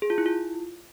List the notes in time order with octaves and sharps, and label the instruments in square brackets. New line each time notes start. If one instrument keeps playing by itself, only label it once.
[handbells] G#4
F4
E4
F4